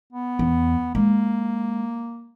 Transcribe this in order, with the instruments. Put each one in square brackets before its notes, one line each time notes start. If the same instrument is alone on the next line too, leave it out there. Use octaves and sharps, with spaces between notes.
[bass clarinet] B3
[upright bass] E2
[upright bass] G#3 [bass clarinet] A#3